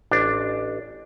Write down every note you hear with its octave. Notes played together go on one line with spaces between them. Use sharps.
A1 D4